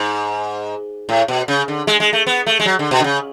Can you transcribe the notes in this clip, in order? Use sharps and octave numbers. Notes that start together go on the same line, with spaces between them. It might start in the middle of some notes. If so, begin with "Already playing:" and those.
Already playing: G#2
A2
B2
C#3
D3
G#3
G#3
A3
B3
A3
G#3
F#3
D3
B2
D3
C#3